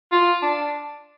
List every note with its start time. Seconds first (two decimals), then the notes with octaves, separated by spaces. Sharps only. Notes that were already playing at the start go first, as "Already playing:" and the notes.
0.12 F4
0.42 D4